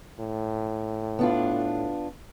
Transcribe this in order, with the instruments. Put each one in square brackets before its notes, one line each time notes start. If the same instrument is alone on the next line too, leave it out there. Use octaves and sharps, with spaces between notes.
[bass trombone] A2
[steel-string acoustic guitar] B3 D4 F4